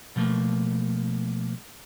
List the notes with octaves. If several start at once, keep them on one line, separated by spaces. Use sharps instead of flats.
B2 F3 A3 A#3